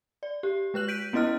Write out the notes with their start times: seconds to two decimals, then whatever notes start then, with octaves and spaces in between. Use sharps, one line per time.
0.23 D5
0.43 G4
0.74 G#3 B4 F#6 F#7
0.88 G6 B6 D7 D#7
1.13 B3 C#4 E4 D#5 F6